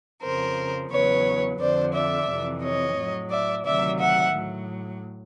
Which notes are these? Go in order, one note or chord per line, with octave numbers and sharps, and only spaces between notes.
F2 C#3 F3 A#4 C5
E2 C#3 F#3 B4 C#5
F2 D3 F3 C5 D5
D5 E5
F2 C3 E3
C#5 D#5
A2 F#3
D5 E5
D2 C3 D#3 F#3 D5 E5
E5 F#5
A2 F#3